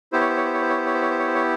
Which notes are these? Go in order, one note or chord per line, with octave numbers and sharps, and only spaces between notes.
B3 E4 G4 C5
C#5
C5
C#5
C5
C#5
C5
C#5
C5
C#5
C5
C#5
C5
C#5
C5
C#5